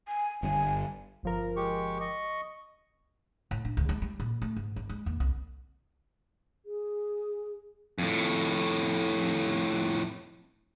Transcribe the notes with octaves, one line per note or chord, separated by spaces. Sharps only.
G#5
G1 G2 G#5
G1 F3 A#4
G#3 G4 C#6
D#5 C#6
A2
D4
D2
G#3
G3
A#2
A3
G#2
G#1
G#3
D#2
C2
G#4
F2 A2